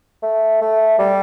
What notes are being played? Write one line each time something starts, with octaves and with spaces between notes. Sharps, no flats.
A3
A3
G3